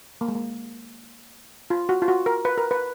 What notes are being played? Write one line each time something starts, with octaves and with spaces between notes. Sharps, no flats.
A#3
G#3
A#3
F4
F#4
F4
F#4
A#4
B4
A#4
B4